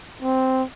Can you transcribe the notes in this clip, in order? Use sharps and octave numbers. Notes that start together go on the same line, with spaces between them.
C4